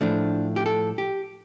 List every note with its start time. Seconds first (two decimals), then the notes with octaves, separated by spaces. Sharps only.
0.01 A2 F3 A3 D4
0.56 G4
0.66 A4
0.98 G4